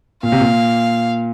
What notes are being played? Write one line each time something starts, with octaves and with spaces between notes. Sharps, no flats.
A#2 F5
C3
A#2